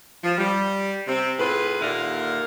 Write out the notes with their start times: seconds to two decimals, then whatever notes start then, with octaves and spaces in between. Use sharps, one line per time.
0.24 F3
0.38 G3
1.07 C3 C4
1.39 A2 F4 G#4 B4
1.81 D#2 A#2 D3 A#4 E5 F5